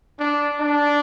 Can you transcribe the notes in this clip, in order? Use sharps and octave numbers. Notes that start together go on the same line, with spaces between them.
D4
D4